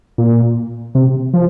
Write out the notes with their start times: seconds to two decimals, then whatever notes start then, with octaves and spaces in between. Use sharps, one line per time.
0.18 A#2
0.95 C3
1.34 F3